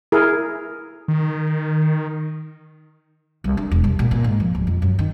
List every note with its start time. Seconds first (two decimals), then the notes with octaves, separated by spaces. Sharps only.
0.12 E4 G#4 A#4
1.08 D#3
3.44 C2
3.57 D4
3.71 E1
3.84 C2
3.99 A#2
4.11 A#2
4.24 G#2
4.40 F3
4.55 D1
4.67 F2
4.82 F#2
4.99 D#3